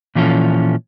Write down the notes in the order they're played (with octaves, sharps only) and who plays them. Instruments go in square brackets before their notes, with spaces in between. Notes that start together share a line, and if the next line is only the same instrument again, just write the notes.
[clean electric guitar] A#2 E3 F3 C#4 A4